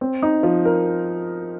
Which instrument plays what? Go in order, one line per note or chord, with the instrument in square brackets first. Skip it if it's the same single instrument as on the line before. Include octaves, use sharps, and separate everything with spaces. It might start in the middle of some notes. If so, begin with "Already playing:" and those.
[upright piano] C4
D#4
F3
A#4